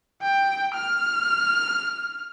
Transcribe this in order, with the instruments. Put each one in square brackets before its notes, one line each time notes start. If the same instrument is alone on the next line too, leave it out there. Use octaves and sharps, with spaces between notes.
[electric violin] G5
F6